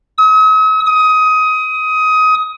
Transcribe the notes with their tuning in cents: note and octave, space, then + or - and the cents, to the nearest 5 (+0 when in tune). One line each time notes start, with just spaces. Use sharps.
D#6 +45
D#6 +20